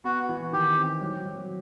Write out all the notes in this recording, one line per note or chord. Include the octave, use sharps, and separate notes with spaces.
B3 F#4
E3
D#3 G4
C4
F#3
F#3